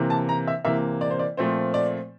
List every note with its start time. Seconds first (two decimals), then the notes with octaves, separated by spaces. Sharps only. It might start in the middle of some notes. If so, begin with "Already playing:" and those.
Already playing: C3 E3 A#3
0.10 A5
0.29 A#5
0.48 E5
0.65 C3 E3 A#3 E5
1.01 D5
1.10 C5
1.19 D5
1.37 A#2 F3 A3 C4 C5
1.74 D5